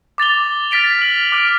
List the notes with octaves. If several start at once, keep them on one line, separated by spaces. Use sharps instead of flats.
D6 A6 F7 G7
F6 A6 B6 D7 F7
F6 F#7
D6 F6 D7